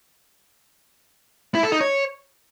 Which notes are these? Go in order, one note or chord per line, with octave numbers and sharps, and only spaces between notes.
E4
A4
D#4
C#5